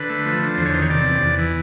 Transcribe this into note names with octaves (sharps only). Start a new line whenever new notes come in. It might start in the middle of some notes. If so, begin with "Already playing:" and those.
Already playing: D3 B4
A3
F3
D3
E2 C5
C#5
D#3 C5
C#5
C3 D5
E2
E2
E3